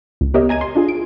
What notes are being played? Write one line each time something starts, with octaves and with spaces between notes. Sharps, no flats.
C#2
B3 G4 A#4 C#5 D#5 E5
G#5 A#5 G#6 D#7
C6
D4 F4 G#4
D7